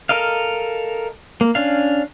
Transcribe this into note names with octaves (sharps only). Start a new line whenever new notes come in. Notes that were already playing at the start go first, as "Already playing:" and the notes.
A4 A#4 D#5 F5
A#3
C#4 D4 F5